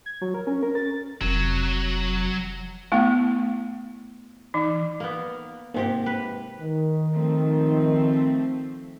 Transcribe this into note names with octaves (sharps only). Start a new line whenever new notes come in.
G#6
F#3
A#4
C#4
A#4
A6
F1 F#3
A3 B3 E4 F5
E3 D#4
A#3 B3
G#2 C3 A#3 G4
B4
D#3
F3 A3 C4